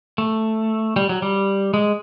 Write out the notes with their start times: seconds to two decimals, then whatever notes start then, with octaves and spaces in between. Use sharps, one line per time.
0.18 A3
0.96 G3
1.09 F#3
1.22 G3
1.74 G#3